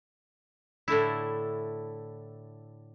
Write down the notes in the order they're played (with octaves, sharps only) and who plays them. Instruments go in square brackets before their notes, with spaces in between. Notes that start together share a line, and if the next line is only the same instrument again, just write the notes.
[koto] A2 D3 A3 E4